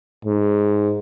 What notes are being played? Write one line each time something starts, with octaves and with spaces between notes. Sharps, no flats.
G#2